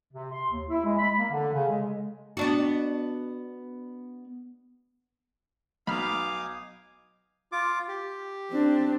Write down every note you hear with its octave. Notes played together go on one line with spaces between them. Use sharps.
C3
C6
D#2
E4
G#3
B5
A#3
D3
C#3
G#3
B3 D4 F#4
B1 D#4 F5 G#5 B5 D6 D#6 F6
F4 D6
G4
C4 D4